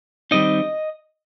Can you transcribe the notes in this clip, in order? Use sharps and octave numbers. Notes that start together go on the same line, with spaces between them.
D#3 G3 C4 D#4 D#5